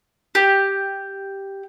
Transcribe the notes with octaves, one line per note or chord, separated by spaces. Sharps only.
G4